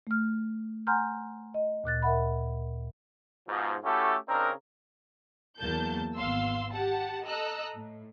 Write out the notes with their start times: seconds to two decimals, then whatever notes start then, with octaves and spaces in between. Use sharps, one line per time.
0.07 A3 F6
0.87 F#5 G#5 A#5 C6 F6 G6
1.54 D#5
1.84 D2 A#2 F#6 A6
2.02 A#4 E5 F#5 B5
3.48 G#2 B2 F3
3.84 A3 C#4 E4 F#4 G4 A4
4.28 C#3 C4 D4 D#4 A#4
5.58 E2 F#3 A#3 A5 G6
6.15 G#1 B3 F5 C6 E6
6.71 G4 F#5 A5
7.26 A4 D#5 A#5 E6 F#6
7.74 A2